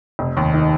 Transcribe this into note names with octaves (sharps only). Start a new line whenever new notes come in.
F1
D#2
D#3